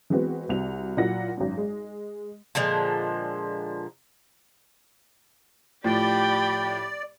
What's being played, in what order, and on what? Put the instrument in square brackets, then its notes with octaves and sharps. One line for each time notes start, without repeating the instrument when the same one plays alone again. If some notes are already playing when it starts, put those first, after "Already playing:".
[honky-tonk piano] E3 G#3 B3 C4 F#4
C2 C4 F#4 F7
A#2 F#3 A#3 E4 F#5 A#6
G#1 F#2
G#3
[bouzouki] A#2 D3 F3 G#3
[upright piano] A2 F3 [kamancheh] G4 B5 [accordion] D5 [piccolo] G5